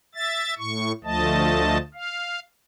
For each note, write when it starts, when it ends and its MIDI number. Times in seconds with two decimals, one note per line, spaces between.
0.15 0.54 76
0.15 0.54 93
0.58 0.92 45
0.58 0.92 85
1.04 1.78 38
1.04 1.78 53
1.04 1.78 57
1.04 1.78 75
1.04 1.78 81
1.94 2.40 77